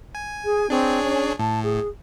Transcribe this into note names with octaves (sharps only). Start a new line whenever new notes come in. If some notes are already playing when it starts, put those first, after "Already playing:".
G#5
G#4
C4 D4 G#4 C#5
C#4
A2 A5
G#4